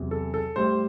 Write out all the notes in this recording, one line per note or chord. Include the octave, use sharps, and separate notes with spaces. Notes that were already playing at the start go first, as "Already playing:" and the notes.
Already playing: E2 C3 F#3
A4
A4
A2 G3 C5